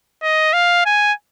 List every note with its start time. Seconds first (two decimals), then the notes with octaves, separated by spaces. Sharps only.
0.23 D#5
0.53 F5
0.86 G#5